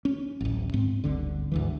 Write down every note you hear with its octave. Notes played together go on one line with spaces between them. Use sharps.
C#4
D1 A1
G#2 C4
G1 D2 D3
D2 G#2 E3